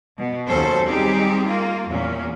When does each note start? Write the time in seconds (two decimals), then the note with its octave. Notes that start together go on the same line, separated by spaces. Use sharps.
0.18 B2
0.47 D#2 F#3 C#4 A4 C5
0.86 G3 C4 D#4 G4 G#4
1.47 A#3 F4
1.88 E2 A#2 C#4